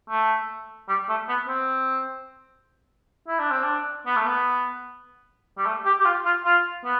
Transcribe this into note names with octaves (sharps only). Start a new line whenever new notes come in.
A3
G3
A3
B3
C4
E4
D4
C4
D4
B3
A3
B3
G3
A3
G4
G4
F4
F4
F4
B3